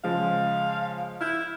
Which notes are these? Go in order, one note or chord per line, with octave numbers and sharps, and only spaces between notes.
C#3 F3 G#3 F5
E4 F6 G6